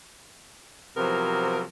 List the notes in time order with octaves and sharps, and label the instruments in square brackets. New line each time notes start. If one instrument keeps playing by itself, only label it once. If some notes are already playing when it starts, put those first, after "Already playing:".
[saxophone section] C3 F3 F#3 B3 A#4